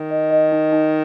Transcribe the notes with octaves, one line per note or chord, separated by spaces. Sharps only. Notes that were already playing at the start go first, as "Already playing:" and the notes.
Already playing: D#3 D#4
D#5
D#5
D#4
D#4